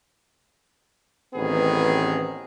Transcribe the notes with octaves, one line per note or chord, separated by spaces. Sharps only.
A1 D#3 B3 C4 G#4